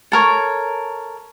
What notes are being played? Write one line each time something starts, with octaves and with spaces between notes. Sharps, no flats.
A4 A#4 C#5